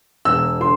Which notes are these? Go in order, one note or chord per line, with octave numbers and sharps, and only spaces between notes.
E1 E6
D3 C6